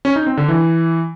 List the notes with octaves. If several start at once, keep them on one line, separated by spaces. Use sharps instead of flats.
C#4
D#4
C4
D3
E3